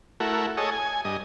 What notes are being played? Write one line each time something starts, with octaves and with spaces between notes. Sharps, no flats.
A3 E4 F#4 A#4
G#4 A4 C#5 D#5
G#5
G2 D#5